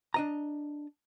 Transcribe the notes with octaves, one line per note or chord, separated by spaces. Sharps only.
D4 D#5 A#5